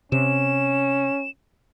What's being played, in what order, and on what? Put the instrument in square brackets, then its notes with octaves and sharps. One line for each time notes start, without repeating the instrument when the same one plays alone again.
[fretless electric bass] C3 [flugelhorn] C#4 [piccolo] E7